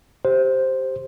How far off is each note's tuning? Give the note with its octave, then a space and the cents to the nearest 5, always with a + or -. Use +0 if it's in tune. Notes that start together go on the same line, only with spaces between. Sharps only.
G4 +0 C5 +0